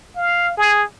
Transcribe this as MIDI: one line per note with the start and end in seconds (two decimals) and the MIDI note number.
0.17 0.56 77
0.57 0.83 68